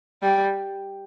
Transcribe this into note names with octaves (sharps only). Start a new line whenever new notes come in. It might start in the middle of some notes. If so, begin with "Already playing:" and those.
G3